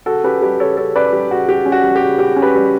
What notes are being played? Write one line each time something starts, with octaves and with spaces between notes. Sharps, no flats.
C#3 F#4 A4
C#4 G4 B4
G3 G4 B4
C#3 A4 C#5
C#3 A4 C#5
C#4 B4 D5
G3 G4
C#3 F#4
C#3 G4
C#4
F#4
G3
G4
C#3
C#3 G4
C#4
G4 B4
G3